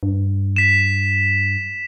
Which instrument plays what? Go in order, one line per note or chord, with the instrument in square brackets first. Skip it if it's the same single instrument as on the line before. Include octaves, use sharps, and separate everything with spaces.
[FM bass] G2
[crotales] B6 E7